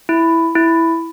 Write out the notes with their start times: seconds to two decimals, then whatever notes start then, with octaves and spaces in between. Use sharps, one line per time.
0.09 E4
0.55 E4